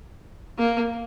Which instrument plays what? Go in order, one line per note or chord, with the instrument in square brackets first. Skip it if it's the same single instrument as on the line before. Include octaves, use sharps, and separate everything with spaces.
[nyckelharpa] A#3